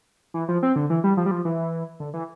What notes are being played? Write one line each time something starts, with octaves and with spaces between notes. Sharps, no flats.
E3
F3
C4
D3
E3
G3
F3
G3
F3
E3
D3
E3